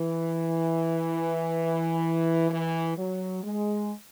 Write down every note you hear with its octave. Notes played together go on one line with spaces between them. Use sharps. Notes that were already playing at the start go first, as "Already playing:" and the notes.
Already playing: E3
E3
F#3
G#3